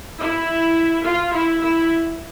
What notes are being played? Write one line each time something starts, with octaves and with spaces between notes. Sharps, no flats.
E4
F4
E4
E4